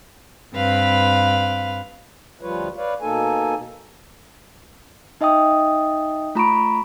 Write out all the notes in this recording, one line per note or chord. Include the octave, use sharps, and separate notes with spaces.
G2 C4 B4 F5 B5
D2 F3 G3 F4 B4 C#5
B4 C#5 D5 F5
B2 A#3 D#4 A4 G#5
D#4 D#5 E5 G5 D#6
A3 F4 A#5 B5 C#6 D7